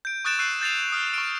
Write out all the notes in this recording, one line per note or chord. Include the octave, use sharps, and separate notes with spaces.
G6 D7
C#6 D#6 F#6 A6 D7 E7
C#6 E6 F#6 C7 D#7
G6 A6 C7 F7
D#6 F6
C#6 D7